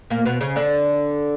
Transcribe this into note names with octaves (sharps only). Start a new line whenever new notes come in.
A#2 A#3
B2 B3
C#3 C#4
D3 D4